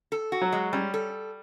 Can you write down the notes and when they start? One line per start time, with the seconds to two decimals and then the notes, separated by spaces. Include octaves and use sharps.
0.12 A4
0.32 F#4
0.41 F#3
0.53 G#3
0.73 G3 C#4
0.94 A4